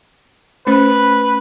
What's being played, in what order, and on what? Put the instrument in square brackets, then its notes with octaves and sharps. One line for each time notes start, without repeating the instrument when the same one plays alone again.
[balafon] A3 C#4 C5 [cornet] B4